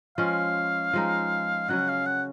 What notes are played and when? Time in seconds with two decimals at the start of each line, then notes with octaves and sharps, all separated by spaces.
0.17 F3 G#3 C#4 F5
0.93 F3 G#3 D#4
1.68 C#3 F#3 C#4 F#5
1.88 F5
2.06 F#5